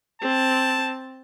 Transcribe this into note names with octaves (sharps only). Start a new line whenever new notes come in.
C4 A5